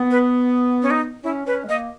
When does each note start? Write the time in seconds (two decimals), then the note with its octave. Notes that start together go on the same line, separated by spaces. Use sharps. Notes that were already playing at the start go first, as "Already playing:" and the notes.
Already playing: B3
0.11 B4
0.82 C#4
0.91 D#4
1.24 C#4 E4
1.46 C#4 B4
1.64 G#3
1.69 A#3 D#5